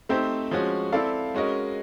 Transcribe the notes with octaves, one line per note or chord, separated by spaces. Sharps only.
A3 C4 D#4 G4 C5
F3 G#3 C#4 F#4
C4 E4 A4 D5 F5
G#3 C#4 F#4 A#4 D#5